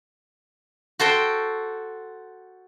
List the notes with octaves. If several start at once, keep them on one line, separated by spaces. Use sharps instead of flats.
F#4 A4 C5 G5